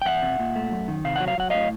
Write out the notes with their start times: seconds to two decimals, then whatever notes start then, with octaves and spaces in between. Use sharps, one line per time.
0.02 G5
0.05 E2 E5 F#5
0.23 C3
0.39 A#2
0.56 A3
0.72 F#2
0.88 D#3
1.04 C3 F5
1.16 F#3 F#5
1.28 F5
1.38 F#3 F#5
1.50 A2 D#5 F5